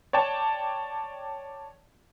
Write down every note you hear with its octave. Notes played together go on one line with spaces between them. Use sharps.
C#5 D5 G5 A5